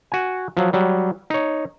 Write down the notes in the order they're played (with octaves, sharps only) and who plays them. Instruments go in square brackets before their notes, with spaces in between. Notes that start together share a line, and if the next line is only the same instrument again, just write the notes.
[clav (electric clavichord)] F#4 G#5
F3 F#3
F#3 G3
D#4 C#5